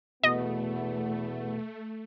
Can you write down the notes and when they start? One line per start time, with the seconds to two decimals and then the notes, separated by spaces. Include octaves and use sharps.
0.23 E2 B2 A3 B3 D#5